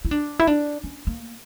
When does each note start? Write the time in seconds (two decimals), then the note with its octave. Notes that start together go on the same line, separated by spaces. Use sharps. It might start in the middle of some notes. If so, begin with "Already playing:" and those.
0.05 E4
0.11 D4
0.39 E4
0.47 D4
0.84 C#4
1.07 A#3